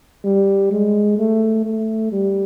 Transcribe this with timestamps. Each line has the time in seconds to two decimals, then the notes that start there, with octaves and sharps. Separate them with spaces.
0.24 G3
0.72 G#3
1.18 A3
1.65 A3
2.12 G3